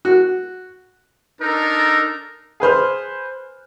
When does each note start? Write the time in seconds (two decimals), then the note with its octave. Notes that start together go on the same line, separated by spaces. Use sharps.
0.05 F#4
1.41 D4 D#4 A4 A#4
2.60 G#4 B4 C5 F6